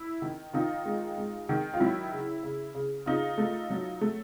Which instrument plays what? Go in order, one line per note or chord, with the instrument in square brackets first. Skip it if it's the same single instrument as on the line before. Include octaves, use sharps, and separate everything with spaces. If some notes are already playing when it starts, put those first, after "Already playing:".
Already playing: [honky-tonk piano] E4
D#3
D#3 D#4 F4
G#3
G#3
D#3
F4
F#3 E4
C#3
C#3
C#3
C#3 D#4 F4
A3
F#3
A3